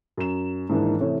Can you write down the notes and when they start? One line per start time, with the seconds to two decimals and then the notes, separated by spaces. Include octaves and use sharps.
0.17 F#2 E7
0.69 G#2 D#3 E3 A#3 D4
1.00 C3 E3 A3 C#5